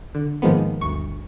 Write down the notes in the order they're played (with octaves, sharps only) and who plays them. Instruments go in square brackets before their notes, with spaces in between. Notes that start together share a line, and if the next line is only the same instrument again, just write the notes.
[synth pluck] D3
G#2 D#3 F3 G#3 A#3 B3
G1 D2 C#6